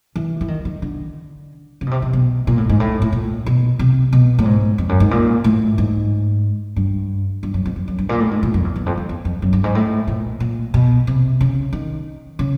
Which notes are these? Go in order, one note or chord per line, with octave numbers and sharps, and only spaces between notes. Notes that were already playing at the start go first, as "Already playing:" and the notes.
E3
E3
D#3
D#3
D3
C#3
B2
C3
B2
B2
A#2
A2
G#2
A2
A2
A#2
B2
C3
B2
A2
G#2
F2
F#2
G#2
A#2
A2
G#2
G2
G2
F#2
F2
F2
F#2
G2
A#2
A2
G#2
A#2
F2
E2
E2
F2
F2
E2
F2
F#2
G2
G#2
A2
A#2
A#2
B2
C3
C#3
D#3
C#3